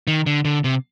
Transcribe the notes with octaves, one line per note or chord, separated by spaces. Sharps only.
D#3
D3
D3
C3